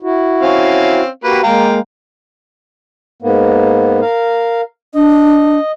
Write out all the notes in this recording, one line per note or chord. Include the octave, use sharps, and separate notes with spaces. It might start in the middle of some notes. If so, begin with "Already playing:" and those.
E4 F#4
C4 C#4 F5
A#3 F#4 G4 B4
G#3 A#3 F5 G5 A#5
G#2 A#3 B3
A#4 F5
D4 D#5